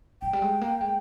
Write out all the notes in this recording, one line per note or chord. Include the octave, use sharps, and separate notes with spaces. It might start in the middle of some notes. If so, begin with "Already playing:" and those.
F3 G5
G3
G#3
A#3
G#3